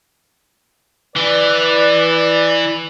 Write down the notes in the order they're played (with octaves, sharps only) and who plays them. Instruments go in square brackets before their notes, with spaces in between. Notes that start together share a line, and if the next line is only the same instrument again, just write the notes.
[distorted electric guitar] E3 [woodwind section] B4 D5